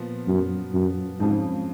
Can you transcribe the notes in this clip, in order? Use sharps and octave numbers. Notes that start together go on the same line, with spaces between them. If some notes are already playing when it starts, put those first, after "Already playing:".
Already playing: A#2 F3 B3
F#2
F#2
F2 G#2 C#3 F3